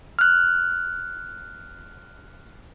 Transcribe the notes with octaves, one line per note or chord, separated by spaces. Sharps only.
F6 F#6